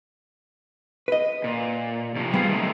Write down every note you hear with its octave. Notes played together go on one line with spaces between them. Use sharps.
B4 D#5
A#2
C3 D#3 F3
G3 B3 F4 G#4 C5
D#3 A3 D#4